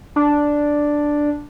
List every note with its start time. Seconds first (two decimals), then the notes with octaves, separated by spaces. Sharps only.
0.16 D4